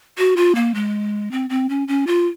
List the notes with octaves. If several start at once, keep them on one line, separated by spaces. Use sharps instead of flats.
F#4
F4
A#3
G#3
C4
C4
C#4
C#4
F4